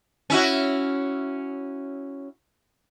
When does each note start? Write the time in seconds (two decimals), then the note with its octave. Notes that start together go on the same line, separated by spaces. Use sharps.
0.30 C#4 E4 F#4